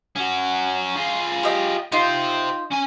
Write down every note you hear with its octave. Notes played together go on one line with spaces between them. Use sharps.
C#4 F#4
F4 G#4
G4 D#5
D#4 F4 G4 C5
C#4 G#5